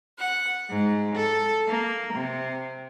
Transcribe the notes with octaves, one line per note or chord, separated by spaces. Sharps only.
F#5
G#2
A4
A#3
C3